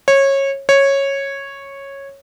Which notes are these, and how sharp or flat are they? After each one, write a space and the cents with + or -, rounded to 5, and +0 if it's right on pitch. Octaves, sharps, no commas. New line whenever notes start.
C#5 -20
C#5 -10